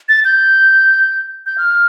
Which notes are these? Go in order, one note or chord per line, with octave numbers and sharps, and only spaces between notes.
A6
G6
G6
F6